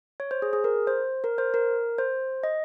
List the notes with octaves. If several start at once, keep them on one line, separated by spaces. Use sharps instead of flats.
C#5
C5
G#4
G#4
A#4
C5
A#4
C5
A#4
C5
D#5